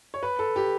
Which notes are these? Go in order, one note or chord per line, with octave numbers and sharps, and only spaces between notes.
C#5
B4
A4
G4